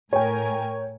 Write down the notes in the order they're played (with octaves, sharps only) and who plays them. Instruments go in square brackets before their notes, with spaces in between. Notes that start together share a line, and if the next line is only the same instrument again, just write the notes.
[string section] A2 A#4 G#5 [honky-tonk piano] C#5 G5